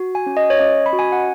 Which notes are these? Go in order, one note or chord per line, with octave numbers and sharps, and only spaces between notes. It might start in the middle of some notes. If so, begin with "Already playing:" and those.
Already playing: F#4
G#5
C#4
D#5
C#5
C#4 D#5
B5
F#4
G#5
F#5